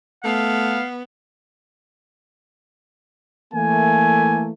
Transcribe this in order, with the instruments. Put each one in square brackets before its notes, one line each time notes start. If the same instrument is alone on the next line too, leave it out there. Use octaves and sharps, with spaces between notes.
[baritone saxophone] A3 [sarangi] B3 [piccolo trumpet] F5
[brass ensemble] E3 A3 A#3 [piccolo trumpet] G#5